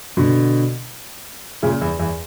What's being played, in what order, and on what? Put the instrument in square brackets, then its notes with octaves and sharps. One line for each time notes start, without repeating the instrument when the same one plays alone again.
[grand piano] B2 D3
A#2 C#3
E2
E2